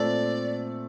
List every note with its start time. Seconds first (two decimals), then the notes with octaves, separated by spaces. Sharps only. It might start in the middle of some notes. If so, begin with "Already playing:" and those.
Already playing: A#2 A3 C4 D5